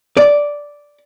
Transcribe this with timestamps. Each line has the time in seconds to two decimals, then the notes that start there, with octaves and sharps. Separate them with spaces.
0.17 D5